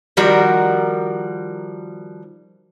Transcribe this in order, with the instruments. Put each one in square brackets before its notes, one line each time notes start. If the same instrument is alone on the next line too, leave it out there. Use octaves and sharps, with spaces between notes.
[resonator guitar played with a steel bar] D#3 F3 G3 F#4 A#4